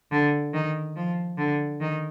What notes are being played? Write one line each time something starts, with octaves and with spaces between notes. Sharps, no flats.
D3
D#3
F3
D3
D#3